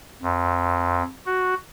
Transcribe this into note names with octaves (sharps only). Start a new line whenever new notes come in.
F2
F#4